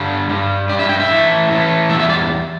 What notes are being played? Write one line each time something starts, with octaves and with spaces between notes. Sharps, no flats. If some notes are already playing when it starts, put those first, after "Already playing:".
Already playing: G2 D3 G3
G2 G3
G2 G3 D5
E5
G5
E5
A2 E3 A3
A2 E3 A3
E2 E3 G3 E5
E5
D5